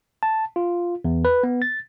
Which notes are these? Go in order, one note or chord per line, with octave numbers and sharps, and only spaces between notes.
A5
F4
E2
B4
B3
A6